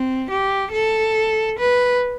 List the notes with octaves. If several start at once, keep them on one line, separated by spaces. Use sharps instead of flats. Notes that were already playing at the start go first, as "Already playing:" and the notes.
Already playing: C4
G4
A4
B4